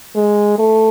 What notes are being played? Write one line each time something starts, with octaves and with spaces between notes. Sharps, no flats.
G#3
A3